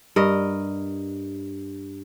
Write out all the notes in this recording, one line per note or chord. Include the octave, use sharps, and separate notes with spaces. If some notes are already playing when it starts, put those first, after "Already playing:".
G2 A#4 D#5